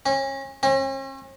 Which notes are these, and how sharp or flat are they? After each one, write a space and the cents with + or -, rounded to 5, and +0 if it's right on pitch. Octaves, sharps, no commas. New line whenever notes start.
C#4 -30
C#4 -45